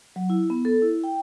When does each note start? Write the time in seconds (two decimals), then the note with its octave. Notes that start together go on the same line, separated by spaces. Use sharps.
0.16 F#3
0.30 E4
0.50 B3
0.65 A4
0.82 E4
1.04 G5